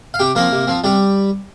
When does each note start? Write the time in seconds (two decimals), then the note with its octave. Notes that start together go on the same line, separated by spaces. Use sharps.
0.14 F5
0.19 C3 G4 G5
0.35 F3 A#3 C4 A#4
0.52 C3
0.67 F3 C4
0.84 C3 G3 G4